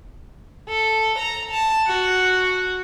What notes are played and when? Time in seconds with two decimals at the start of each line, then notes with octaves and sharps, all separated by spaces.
0.69 A4
1.18 A#5
1.51 A5
1.87 F#4